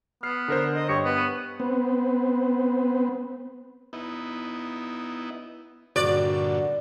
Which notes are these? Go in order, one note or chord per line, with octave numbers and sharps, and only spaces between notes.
B3 F6 C7
D3 A#4 C5
D#5
G2 G4 C#5 C#7
B3
D#7
B3 C4
B3 D#4 E4
G2 A#2 D3 F#4 D5